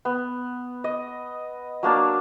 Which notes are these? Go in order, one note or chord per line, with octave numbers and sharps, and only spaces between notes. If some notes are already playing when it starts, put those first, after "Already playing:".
B3
D#5
F#3 A#3 D4 A5